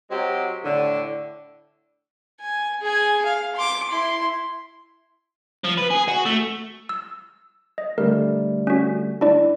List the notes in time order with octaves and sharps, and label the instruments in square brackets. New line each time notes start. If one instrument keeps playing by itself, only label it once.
[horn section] F#3 G#3 C4 G4
A2 D3
[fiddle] G#5
G#4 G#5
F5
C6 D6
E4 C6
[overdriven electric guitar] F3
B4
G#4
F#4
A3
[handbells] E6
D#5
[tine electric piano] D3 G3 A3 [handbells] A#4
[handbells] C#4 F#4
D4 E4 D5